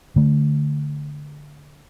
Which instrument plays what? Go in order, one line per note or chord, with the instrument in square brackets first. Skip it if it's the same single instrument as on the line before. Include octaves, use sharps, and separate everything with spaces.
[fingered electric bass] D3 A3